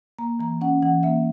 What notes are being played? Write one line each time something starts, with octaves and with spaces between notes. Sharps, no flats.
A#3 A#5
E3 A#5
C#4 F#5
E3 F#5
A#3 E5